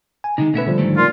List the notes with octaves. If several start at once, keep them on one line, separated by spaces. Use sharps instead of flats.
G#5
C3 D#3 G#3 D#4
B2 A3 C#4 B4 E5
D3 F3 G3
G#2 D#3 A3
A#2 F4